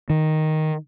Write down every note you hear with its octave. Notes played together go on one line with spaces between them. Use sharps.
D#3